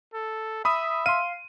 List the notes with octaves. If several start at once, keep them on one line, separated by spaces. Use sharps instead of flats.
A4
E5 B5 D#6
F5 C6 D#7